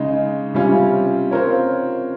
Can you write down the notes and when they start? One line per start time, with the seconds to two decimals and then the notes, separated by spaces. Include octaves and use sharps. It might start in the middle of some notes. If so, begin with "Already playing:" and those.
Already playing: C#3 G#3 D#4
0.54 C3 G3 C#4 F4
1.31 C4 F4 A#4 C#5